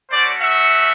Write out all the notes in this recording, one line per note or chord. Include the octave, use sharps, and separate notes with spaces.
A3 C#4 F#4 C5 D5
E5 F#5